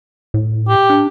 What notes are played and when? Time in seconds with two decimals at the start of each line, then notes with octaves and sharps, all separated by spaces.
0.34 A2
0.69 G4
0.90 D4